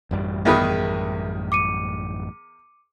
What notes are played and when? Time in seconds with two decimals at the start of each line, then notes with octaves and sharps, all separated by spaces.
0.11 A1 F#2 G3
0.45 E2 D#3 G#4 A#4 B4 E5
1.52 D6 C#7 D#7